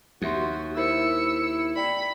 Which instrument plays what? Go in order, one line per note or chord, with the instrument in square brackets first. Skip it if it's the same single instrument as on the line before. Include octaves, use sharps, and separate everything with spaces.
[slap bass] D#2 [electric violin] F#4 [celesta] G4 E5 C6
[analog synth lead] E4 [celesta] A#4 C5 [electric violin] E6 C#7
[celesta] D5 G5 [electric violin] B5